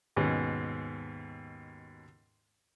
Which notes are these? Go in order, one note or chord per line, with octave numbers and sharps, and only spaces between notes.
D#2 G#2 B2 C#4